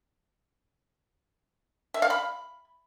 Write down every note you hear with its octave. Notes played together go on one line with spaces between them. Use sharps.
E5
F5
B5